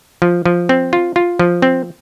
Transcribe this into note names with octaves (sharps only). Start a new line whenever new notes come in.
F3
F3
C4
F4
F4
F3
C4